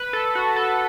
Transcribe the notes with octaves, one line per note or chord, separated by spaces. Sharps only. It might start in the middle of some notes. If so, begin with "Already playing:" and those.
Already playing: B4
A4
F#4
A4